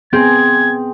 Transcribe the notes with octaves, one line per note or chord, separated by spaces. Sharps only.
B3 C4 G#4 G#6